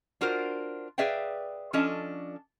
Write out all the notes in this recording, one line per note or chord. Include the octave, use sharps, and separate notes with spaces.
D4 F4 F#4 A#4 C5
G#4 B4 D5 E5 F5 G5
F3 C#4 D4 A4 D#5